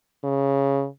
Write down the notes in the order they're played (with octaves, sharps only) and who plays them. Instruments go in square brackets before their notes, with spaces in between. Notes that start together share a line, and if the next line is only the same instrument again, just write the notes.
[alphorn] C#3